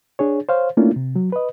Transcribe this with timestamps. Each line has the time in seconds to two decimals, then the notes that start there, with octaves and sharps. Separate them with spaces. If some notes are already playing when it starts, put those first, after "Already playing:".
0.19 D4 G#4 C#5
0.49 C5 C#5 F5
0.77 A3 A#3 C#4 D4 E4 F4
0.96 C3
1.16 F#3
1.32 B4 D#5